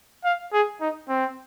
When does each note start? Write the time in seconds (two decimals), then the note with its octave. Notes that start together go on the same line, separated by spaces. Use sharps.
0.24 F5
0.53 G#4
0.81 D#4
1.08 C4